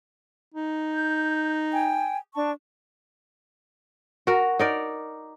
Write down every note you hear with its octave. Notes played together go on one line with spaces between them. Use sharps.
D#4
G6
G5 G#5
D4 A5 C#6
F#4 A#4
D#4 A#4 D5